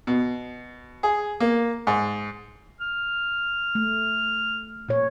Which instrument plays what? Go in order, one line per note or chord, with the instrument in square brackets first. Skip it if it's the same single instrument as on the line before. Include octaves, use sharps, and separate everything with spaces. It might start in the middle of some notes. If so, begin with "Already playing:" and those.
[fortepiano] B2
G#4
A#3
G#2
[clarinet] F6
[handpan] A3
A#2 C#5